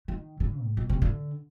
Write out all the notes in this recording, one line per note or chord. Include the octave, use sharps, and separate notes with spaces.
D#3
D3
G#2
B2
C3
D3